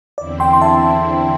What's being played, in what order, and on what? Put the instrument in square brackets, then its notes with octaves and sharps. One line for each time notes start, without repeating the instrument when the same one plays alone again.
[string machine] E2 D3 C4 E4 [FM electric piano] D5
[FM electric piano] G5 C6
C6
E5 A5